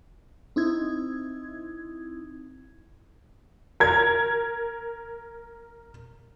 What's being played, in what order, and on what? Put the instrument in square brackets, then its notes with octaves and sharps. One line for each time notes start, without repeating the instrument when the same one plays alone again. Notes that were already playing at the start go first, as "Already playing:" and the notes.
[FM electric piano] C4 D#4 E4 G#6
[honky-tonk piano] A#4 G#6